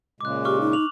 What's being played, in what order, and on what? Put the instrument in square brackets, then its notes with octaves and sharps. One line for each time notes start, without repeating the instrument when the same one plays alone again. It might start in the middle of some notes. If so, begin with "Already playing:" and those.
[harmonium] A#2 C#3 G#3 [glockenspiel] D6 F#6
[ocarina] G4 [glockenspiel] C#6 D6 F6
[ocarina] D#4
[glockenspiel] D6 F7 F#7